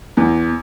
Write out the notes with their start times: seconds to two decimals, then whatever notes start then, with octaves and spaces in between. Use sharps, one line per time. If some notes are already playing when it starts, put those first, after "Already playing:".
0.17 E2